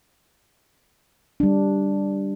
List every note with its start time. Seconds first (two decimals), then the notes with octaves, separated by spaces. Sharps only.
1.40 G3 D4